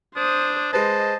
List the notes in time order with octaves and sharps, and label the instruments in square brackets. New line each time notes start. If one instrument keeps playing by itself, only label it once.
[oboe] D4 [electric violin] C5 D#6
[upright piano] G#3 B4 [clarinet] C5 [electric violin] D#5 [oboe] A5